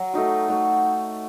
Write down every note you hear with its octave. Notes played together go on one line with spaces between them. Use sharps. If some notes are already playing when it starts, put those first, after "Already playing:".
Already playing: F#3
A3 D#4 F#4
A3 D#4 F#4